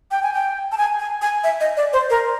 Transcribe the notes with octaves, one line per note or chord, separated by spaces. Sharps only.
G5
G#5
G5
A5
G#5
G#5
G#5
E5
D#5
D5
C5
A#4